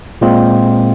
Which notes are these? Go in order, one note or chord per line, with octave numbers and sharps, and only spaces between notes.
A#2 G#3 C4 F4